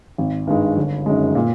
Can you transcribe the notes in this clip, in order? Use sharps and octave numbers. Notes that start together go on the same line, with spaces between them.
G#1
G2 D#3 G#3
G1
F#2 D#3 G#3
A#2